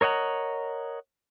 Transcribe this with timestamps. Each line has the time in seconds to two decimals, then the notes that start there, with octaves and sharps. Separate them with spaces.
0.01 A#4 C#5 D#5 F#5 A#5